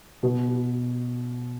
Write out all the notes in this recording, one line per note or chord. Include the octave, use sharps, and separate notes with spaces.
B2